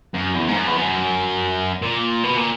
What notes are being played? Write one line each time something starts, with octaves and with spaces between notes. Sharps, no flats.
F#2
E2
G#2
F#2
E2
F#2
A#2
B2
A#2